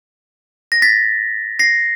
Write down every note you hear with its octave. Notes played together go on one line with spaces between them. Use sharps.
A#6
A6 B6
A#6 C7